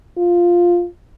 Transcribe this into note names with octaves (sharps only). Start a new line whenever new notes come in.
F4